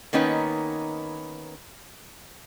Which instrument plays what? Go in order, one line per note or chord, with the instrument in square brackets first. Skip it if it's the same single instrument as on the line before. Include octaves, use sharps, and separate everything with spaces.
[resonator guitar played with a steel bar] D#3 A#3 B3 C#4 D#4 B4